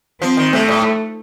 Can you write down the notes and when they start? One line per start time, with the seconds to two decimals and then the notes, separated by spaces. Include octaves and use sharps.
0.21 F3 C4
0.37 D#3
0.53 C3 A3
0.68 A2